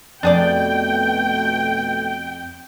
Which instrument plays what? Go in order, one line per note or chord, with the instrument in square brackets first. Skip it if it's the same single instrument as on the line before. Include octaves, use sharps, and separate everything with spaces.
[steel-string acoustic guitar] F2 [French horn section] B2 A3 [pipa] D4 G#4 D5 [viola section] G5